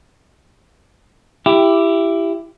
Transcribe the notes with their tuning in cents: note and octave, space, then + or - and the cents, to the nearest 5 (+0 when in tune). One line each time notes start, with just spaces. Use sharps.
E4 +15 G4 +0